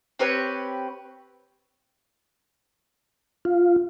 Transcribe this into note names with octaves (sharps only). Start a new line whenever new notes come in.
C4 G4 B4 C#5
F4